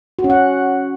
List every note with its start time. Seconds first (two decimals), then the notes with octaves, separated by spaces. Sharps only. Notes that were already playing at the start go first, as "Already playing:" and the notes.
0.19 F#4
0.24 C#4
0.30 F#5